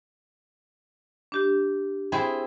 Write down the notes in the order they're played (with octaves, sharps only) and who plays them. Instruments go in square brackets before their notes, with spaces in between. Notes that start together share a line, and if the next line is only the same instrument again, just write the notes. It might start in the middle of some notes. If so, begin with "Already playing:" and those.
[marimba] D4 G4
[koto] C4 E4 G#4